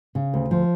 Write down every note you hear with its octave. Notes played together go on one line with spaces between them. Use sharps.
C#3
D2
F3